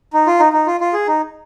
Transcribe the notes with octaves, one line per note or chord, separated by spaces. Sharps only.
D#4
F4
D#4
D#4
F4
F4
G#4
D#4